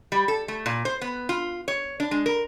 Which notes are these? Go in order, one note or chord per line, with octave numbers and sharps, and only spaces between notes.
G3
A4
A3
A#2
C5
B3
F4
C#5
D4
G#3
A#4